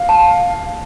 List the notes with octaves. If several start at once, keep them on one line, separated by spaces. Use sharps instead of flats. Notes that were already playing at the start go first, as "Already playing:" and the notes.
Already playing: F5
A5